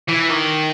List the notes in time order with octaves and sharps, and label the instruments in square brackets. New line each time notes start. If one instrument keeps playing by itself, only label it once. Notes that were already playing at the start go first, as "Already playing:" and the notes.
[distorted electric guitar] E3
D#3